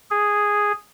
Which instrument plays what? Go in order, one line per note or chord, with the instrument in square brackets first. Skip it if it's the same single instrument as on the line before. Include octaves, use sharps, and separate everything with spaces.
[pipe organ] G#4